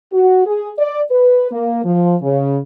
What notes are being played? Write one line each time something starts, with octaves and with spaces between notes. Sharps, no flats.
F#4
G#4
D5
B4
A#3
F3
C#3